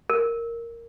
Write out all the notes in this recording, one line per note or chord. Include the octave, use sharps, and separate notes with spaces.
A#4